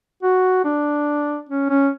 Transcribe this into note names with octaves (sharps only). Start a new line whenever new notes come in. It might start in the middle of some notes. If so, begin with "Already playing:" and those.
F#4
D4
C#4
C#4